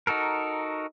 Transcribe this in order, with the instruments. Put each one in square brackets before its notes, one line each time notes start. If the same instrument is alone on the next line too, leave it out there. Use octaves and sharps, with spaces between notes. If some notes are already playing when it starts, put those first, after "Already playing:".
[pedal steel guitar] D#4 F#4 A4 A#4